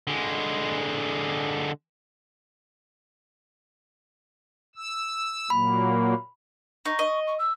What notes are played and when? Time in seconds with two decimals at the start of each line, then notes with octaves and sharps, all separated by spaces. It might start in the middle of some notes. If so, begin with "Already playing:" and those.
0.08 D3 G#3
4.76 E6
5.50 A#2 F#3 A#3 B5
6.85 D#4 C#6
6.99 D#5
7.27 C#6
7.39 E6